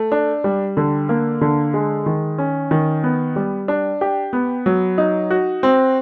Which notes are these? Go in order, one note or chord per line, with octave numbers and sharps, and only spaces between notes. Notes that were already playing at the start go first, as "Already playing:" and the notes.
Already playing: A3
D4
G3
D3
A#3
D3
G#3
D#3
C#4
D#3
B3
G3
D4
G4
B3
F#3
D#4
F#4
C4